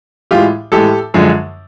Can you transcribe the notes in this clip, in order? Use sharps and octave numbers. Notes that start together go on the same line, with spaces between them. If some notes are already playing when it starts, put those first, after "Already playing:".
A2 E3 G#3 F4 G4
A2 E3 G#3 G4 A4
F#2 D3 F3 G#3